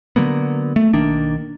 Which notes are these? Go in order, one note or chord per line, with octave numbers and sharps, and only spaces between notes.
D3 F#3 A#3 B3
A3
B1 D#3 A#3 D4